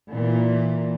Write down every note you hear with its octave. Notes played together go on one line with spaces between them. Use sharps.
A#2 E3